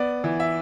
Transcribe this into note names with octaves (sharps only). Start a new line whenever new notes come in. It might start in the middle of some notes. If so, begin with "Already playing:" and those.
Already playing: B3 D5
E3
E5